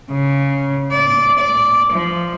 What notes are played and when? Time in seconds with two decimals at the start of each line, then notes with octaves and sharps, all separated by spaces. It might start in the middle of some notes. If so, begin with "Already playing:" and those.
0.11 C#3
0.93 D5
1.39 D5
1.92 F3